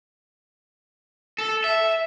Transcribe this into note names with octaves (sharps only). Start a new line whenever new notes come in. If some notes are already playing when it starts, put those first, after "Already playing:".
A4
E5